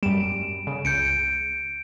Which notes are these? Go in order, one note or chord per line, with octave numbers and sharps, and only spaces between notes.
F#2 G3 D7 E7
C#3
C#2 G6 C#7 D7